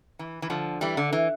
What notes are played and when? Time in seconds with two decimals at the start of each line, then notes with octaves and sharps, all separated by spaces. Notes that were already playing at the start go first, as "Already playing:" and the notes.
0.19 E3
0.42 E3
0.50 D3 F3
0.81 E3 G3
0.97 D3
1.13 E3